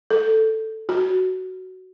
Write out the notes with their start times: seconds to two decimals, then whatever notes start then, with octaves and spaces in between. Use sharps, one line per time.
0.10 A4
0.89 F#4